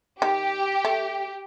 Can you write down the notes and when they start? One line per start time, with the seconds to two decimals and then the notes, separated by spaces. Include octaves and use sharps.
0.22 D#3 G4
0.85 A3